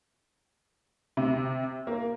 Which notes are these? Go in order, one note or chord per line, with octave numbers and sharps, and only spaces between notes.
C3
A#3